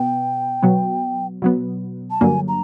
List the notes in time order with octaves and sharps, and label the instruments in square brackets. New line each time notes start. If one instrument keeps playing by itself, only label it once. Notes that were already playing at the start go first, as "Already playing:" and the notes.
Already playing: [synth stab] B2 B3 [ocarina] G5
[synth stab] B2 F#3 B3
B2 F#3 B3
[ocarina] A5
[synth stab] G2 D3 F#3 A#3 [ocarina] G#5
[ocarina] A#5